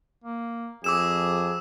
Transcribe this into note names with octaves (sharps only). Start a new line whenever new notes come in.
A#3
F2 G#4 D6 E6 E7